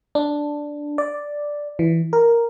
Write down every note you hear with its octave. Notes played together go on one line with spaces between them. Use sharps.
D4
D5
E3
A#4